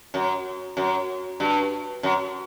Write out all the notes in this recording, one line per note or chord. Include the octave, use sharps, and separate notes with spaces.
F#2
F#2
G2
F#2